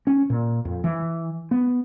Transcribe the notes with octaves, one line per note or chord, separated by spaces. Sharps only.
C#4
A#2
F2
E3
B3